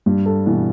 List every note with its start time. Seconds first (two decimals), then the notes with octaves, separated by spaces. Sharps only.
0.06 G2 G3
0.26 A4
0.46 B2 E3